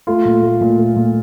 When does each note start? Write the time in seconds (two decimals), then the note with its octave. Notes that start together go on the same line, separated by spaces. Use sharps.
0.07 A3 F4
0.25 A#2
0.43 A3
0.61 A#2
0.79 A3
0.96 A#2